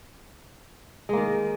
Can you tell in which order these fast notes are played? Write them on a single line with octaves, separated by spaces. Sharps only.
G#3 A#3 D#3